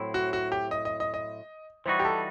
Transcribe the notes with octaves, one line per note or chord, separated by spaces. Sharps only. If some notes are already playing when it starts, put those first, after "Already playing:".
Already playing: A2 F#3 C4 E4
F#4
F#4
G4
D#5
D#5
D#5
D#5
E3 G3 D#4 F#4 C5
G4
A4